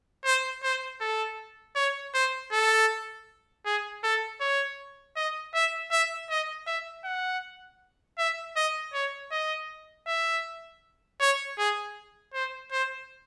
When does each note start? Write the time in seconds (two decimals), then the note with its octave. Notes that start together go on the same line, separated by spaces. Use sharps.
0.25 C5
0.63 C5
1.01 A4
1.76 C#5
2.14 C5
2.52 A4
3.66 G#4
4.03 A4
4.41 C#5
5.16 D#5
5.54 E5
5.92 E5
6.30 D#5
6.67 E5
7.04 F#5
8.18 E5
8.56 D#5
8.94 C#5
9.31 D#5
10.07 E5
11.20 C#5
11.58 G#4
12.34 C5
12.72 C5